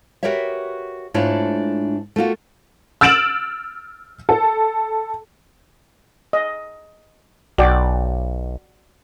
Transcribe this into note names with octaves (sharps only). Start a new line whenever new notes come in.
F#4 G4 A#4 B4 C#5 E5
G#2 A3 D4 E4 F4 C#5
A3 A#3 F4 F#4
E6 F6 A6 D7 E7 F#7
A4
D#5
B1 F#4 D5 G5